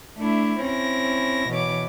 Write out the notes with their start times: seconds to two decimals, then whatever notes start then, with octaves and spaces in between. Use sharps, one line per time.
0.18 A3 D4 E4
0.62 C4 C#4 E4 A#6
1.49 B2 E3 C#5 D6